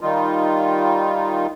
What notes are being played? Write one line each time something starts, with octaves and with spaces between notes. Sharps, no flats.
D#3 G3 D#4 F4